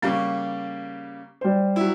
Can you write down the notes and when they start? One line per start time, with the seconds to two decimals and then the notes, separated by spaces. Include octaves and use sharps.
0.02 C#3 G3 A#3 C#6 A6
1.41 G3 C5
1.76 F#3 E4